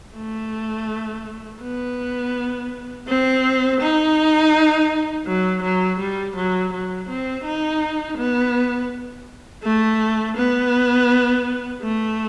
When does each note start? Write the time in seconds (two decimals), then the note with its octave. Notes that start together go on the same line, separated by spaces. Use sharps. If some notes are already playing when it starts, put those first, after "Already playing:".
0.16 A3
1.62 B3
3.07 C4
3.80 D#4
5.26 F#3
5.62 F#3
5.99 G3
6.36 F#3
6.73 F#3
7.09 C4
7.44 D#4
8.17 B3
9.63 A3
10.37 B3
11.82 A3